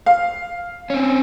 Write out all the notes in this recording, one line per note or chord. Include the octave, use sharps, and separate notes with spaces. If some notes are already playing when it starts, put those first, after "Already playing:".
F5
C4 C#4